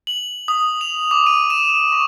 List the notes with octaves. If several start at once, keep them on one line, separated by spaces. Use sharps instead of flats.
F#7
D#6
F7
D6
D#7
E7
C#6